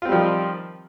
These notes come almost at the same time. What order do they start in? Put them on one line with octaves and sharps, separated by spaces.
F4 C4 G3 F3 D#3